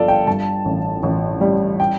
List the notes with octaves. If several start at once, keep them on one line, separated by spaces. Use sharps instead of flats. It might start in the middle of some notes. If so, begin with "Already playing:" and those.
Already playing: G1 F3 A4 D5 F5
G5
G2 A5
A1
A1
G3
G5